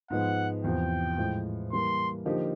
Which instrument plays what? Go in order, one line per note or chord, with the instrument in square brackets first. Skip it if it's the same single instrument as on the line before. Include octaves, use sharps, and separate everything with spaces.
[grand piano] G#2 F3 G#3 B3 [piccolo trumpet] F#5
[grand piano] E2 C3 F3 [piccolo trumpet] G5
[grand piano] A2 F3 G#3
[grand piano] E3 G3 A#3 [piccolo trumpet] C6
[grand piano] D3 F3 A#3 D#4 G4